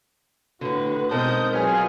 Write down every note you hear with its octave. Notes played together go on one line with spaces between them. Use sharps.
A2 D3 F#4 B4
B2 G#3 C4 D#4 A#4 A5 D#6 G6
F#3 F4 G#4 B4 C#5 G#5 F6